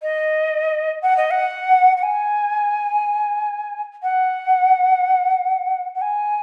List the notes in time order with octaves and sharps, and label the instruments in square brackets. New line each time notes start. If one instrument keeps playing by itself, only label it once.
[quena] D#5
F#5
D#5
F#5
F#5
G#5
F#5
F#5
G#5